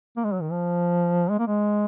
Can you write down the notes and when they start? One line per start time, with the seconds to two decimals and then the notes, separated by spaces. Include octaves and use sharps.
0.17 A#3
0.24 G#3
0.33 F#3
0.41 D#3
0.51 F3
1.30 G#3
1.39 A#3
1.47 G#3